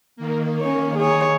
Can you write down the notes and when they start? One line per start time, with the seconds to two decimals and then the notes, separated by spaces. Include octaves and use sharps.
0.16 D#3 A#3
0.61 C#4 C#5
0.97 G#4 C#5